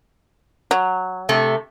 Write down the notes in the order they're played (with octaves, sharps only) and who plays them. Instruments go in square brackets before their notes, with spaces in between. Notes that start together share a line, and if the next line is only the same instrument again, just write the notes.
[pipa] F#3
[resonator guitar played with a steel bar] C3 A3